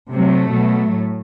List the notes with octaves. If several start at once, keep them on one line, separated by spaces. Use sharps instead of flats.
C3 F#3 A3
B2 F#3
A2